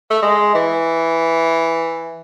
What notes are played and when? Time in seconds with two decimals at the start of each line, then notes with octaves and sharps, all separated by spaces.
0.11 A3
0.23 G#3
0.55 E3